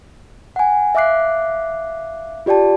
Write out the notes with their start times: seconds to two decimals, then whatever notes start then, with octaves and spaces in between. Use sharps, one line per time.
0.56 F#5 G#5
0.95 E5 F5 D6 F#6 C7
2.46 F4 G4 D5 G5 A5